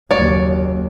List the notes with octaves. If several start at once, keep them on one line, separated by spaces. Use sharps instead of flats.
F#1 D#2 C#5 D5